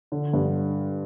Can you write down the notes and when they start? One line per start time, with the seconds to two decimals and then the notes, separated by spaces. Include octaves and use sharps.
0.12 D3
0.33 G2